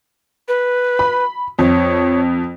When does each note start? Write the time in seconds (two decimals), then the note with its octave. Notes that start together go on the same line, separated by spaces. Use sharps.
0.48 B4
0.99 B5
1.59 F2 C#5